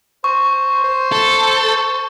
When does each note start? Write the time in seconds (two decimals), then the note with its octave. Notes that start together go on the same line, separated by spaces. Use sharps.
0.24 C5 C#6
0.84 C5
1.12 A4